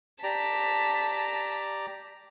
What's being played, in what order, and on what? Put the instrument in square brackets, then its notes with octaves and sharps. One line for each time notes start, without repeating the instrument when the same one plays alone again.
[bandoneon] G4 D5 A#5 [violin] A5 B6